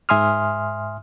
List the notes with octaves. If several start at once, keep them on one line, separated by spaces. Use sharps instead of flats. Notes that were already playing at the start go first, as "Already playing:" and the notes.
G#2 E5 G#5 C6 D#6 F6